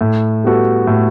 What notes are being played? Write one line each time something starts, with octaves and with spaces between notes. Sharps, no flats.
A2
G3 B3 F#4 A4
A2